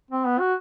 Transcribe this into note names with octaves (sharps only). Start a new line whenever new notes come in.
C4
B3
F#4